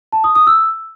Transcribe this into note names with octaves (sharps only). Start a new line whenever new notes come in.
A5
D#6
D#6
E6